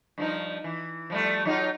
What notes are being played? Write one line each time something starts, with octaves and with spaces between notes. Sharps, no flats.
G2 F3 D#4
E3
F3 G3 A3
F#3 D#4 F4